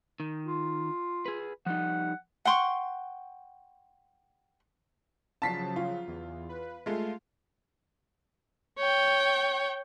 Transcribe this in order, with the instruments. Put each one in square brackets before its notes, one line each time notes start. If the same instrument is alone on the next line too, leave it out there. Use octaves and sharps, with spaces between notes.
[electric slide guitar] D#3
[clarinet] F4
[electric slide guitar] G#4 B4
[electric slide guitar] F3 G3 D#4 [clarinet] F#5
[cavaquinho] F#5 G5 C6 C#6
[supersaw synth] C#3 F3 F#3 [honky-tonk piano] A5 B6 C7
[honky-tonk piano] F4
[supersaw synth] E2
B4
[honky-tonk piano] G#3 A3 [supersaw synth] F4 F5
[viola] C#5 G5